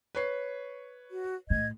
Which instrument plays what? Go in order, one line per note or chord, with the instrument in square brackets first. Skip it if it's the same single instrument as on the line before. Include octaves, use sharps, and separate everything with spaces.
[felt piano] B4 C#5 C7
[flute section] F#4
[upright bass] A2 [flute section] D#5 G#6